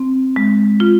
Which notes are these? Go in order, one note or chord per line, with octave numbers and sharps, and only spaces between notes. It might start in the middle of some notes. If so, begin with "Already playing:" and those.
Already playing: C4
G#3
F4